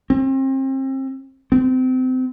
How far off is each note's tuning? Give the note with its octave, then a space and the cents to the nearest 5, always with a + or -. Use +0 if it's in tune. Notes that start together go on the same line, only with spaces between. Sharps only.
C4 +35
C4 -30